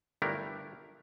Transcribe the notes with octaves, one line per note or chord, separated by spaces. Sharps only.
G1 A3 D4 E4 G4 A#4